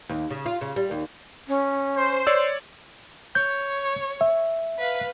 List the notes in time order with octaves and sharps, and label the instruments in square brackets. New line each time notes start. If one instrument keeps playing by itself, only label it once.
[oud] D#2
C#3
F4
C#3
G3
D#2
[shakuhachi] C#4
[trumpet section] C5
[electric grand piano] C#5 D5 E6
[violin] C#5 [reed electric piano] G6
[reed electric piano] E5
[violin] B4 F5